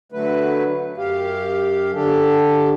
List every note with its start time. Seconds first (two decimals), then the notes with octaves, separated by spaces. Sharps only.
0.12 D3 F#3 A3 B4
0.98 F#2 G4 F5
1.93 D3 D4 G4 A4